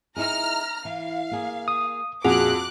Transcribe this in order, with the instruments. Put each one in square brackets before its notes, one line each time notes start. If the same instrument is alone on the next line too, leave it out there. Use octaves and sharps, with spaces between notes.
[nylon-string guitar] D#4 E4 G#4 [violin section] A#5 F6
[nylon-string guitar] E3 [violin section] F5
[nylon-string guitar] A#3 G#4
[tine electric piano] D#6
[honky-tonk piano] F2 F#4 F7 [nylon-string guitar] A#2 [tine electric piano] G#4 [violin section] D6 F#6